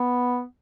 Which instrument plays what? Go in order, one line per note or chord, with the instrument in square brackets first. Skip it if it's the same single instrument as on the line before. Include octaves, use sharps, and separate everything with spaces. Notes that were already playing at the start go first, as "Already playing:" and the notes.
Already playing: [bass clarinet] B3